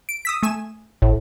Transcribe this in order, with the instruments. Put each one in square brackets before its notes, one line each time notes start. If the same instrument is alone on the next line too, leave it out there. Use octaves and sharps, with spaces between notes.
[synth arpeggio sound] D7
D#6 E6 B6
A3 G#5 E7
[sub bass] G#1 [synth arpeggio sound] A2